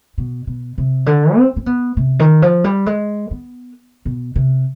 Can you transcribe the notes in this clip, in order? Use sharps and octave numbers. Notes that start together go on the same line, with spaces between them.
B2
B2
C3
D3
C4
C4
B3
C3
D#3
F3
G3
G#3
B3
B2
C3